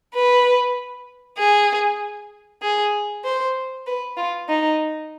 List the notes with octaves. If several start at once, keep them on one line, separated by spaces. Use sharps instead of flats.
B4
G#4
G#4
C5
B4
F4
D#4